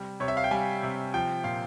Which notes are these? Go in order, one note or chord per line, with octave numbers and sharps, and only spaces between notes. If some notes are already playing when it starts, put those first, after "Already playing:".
Already playing: C3 G3
C3 C#5
E5
F5
G5
G3 G#5
C3
F3 G5
A#2 F5